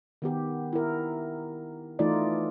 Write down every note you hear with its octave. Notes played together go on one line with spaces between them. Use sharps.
D#3 B3 G4
E4 A#4
E3 A3 D#4 F4 D5